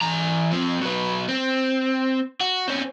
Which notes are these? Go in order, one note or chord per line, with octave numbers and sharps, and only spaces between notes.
E3 A#5
F3 C4
F#3 B4
C4
F#4
C4 C#4